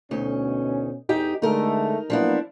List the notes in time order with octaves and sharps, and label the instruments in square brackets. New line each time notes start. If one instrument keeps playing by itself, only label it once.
[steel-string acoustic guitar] D2 D#4 [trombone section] B2 C#4
[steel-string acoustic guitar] E2 D#4 G4
[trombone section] D3 G#3 A3 [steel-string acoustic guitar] D#4 A#4
[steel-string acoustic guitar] F3 D4 E4 [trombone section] F#3 A#3 B3